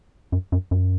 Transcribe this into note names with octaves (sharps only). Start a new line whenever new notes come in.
F#2
F#2
F#2